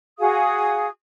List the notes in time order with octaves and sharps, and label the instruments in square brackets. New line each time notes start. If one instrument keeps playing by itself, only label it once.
[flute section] F#4 G#4 F5 D#6